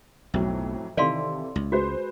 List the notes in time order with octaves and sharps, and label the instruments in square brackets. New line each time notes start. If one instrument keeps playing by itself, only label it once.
[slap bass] B1 [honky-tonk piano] F2 A2 F#3
[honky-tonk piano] C3 E3 A4 [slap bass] D#3 [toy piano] D5 F5 C6
[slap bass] C#2
[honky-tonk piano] G#3 B4 C5 [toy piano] F#4